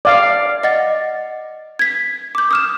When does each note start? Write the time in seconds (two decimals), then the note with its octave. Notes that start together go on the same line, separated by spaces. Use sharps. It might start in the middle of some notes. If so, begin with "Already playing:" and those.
0.05 D5 F5
0.63 D#5 F#5 A6
1.79 G#6 B6
2.35 D6 G6
2.51 D#6 F6 E7